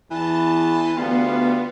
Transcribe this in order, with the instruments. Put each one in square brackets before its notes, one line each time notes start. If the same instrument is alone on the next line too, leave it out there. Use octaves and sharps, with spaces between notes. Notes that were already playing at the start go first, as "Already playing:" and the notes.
[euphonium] E2 [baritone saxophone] E3 [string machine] A5
[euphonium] D2 [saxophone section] G3 F4 F5 [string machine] B3